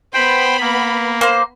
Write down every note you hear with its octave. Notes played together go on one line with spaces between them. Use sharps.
B3 C5 G5 B5
A#3
A#3 C5